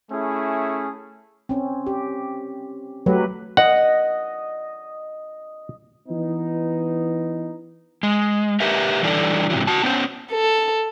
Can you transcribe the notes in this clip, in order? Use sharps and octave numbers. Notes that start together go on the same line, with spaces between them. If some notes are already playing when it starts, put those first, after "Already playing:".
A3 C#4 E4 G#4
C4 C#4
G4
F#3 A3 G4 B4
D#5 F#5
E3 B3 D#4
G#3
G4 A#4 B4 E5
E3 G3 D4 E4 A4 D5
G#2 C3 D#3 E3 F#3
F#4 A5
B3 C#4 C5
A4